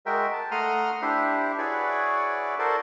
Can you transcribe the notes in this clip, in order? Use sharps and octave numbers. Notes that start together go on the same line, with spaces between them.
G#3 F#4 A#4 E5 G5
A5
A3 F#5 A#5 C6 D#6 F6
D4 E4 G4 C5 E5
E4 F#4 G#4 B4 C#5 D5
F#4 A4 A#4 C5 D5